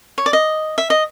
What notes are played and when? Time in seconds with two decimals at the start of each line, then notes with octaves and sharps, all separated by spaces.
0.18 C#5
0.26 D5
0.33 D#5
0.78 E5
0.90 D#5